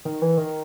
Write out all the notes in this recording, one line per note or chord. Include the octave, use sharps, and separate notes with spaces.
D#3
E3
D#3